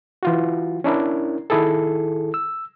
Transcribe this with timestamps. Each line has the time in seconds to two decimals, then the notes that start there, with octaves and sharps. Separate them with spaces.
0.23 E3 F4 F#4
0.84 C#4 D4 E4 A#4
1.50 D#3 E4 G#4 A4
2.34 E6